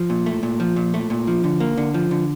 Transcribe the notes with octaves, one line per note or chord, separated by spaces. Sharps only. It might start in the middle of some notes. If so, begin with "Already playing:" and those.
Already playing: F3
A#2
A3
A#2
F3
A#2
A3
A#2
F3
D3
A#3
D3
F3
D3